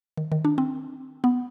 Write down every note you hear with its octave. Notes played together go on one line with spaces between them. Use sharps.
D#3
D#3
D4
C4
B3